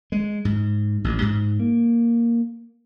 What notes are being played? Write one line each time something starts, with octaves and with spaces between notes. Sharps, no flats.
G#3
G#2
A1
G#2
A#3